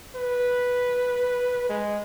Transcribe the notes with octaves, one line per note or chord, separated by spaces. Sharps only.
B4
G#3